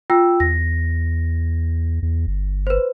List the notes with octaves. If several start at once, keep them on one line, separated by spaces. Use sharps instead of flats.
F4 G5 E6
E2 A#6
E2
G1
B4 C5